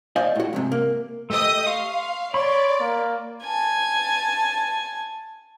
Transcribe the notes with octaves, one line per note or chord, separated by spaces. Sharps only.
C5 D5 D#5 F5 G#5
A2 F#4
E2 G#2 C3
A#3
A3 G4 D#5 D#6 E6
F5 C6 C#6
C#5 D5 B5 C6
A#3
G#5 A5